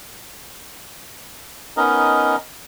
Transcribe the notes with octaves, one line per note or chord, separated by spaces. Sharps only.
B3 C#4 D#4 A#4 D#5